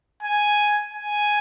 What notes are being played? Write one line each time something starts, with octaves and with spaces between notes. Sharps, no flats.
G#5
G#5